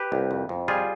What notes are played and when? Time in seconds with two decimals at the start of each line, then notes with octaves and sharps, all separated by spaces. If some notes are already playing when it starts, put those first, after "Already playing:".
Already playing: G4 B4
0.12 C2
0.31 F2
0.49 F2
0.68 G3 F4 G#4